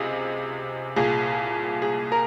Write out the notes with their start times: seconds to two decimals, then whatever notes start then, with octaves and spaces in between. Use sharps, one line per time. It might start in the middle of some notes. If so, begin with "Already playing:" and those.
Already playing: C#2 C3 G#4 D#5
0.96 C2 A#2 G#4
1.82 G#4
2.12 A#4